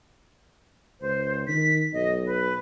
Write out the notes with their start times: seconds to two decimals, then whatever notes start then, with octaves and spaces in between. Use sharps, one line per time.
1.01 C#2 C5
1.48 D#3 B6
1.93 B1 D#5
2.26 B4